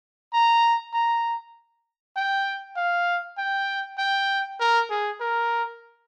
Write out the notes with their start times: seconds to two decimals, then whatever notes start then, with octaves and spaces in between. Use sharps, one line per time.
0.33 A#5
0.93 A#5
2.16 G5
2.76 F5
3.38 G5
3.98 G5
4.60 A#4
4.90 G#4
5.20 A#4